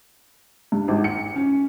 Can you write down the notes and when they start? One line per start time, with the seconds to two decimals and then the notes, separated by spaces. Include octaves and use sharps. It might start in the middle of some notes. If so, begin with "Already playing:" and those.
0.72 G2
0.88 G#1
1.04 C#7
1.36 C#4